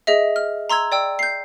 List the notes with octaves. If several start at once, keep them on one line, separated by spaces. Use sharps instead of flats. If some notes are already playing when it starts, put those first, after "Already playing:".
G#4 D#5 E5
F6
A#5 C6 E6 G#6
D5 G5 E6
G6 C7